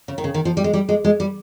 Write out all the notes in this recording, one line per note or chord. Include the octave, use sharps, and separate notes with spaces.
C#3
D#3
C#3
D#3
F3
G3
G#3
G3
G#3
G#3
G3